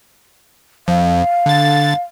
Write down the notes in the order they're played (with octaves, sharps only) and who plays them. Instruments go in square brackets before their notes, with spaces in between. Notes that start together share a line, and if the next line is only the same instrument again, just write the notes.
[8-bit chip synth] F2 [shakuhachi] F5
[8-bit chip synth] D3 A6